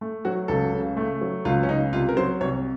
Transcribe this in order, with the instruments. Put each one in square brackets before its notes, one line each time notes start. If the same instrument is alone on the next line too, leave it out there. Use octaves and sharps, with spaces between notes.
[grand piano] A3
[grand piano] F#3 [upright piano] F#4
[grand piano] C#2 [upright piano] A4
[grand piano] C#3
A3
F#3
[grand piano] C#2 [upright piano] F4
[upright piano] C#4
[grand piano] C#3 [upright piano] D#4
[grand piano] C2 [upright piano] F4
[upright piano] A#4
[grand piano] F#3 [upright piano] C5
[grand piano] C2 [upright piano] C#5